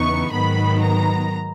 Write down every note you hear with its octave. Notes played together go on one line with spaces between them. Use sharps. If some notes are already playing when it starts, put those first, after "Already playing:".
Already playing: E2 C#3 E3 B3 D#4 C#6
G#2 D#3 F#3 B3 B5
A#5